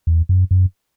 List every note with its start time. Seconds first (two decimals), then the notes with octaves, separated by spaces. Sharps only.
0.07 E2
0.29 F#2
0.51 F#2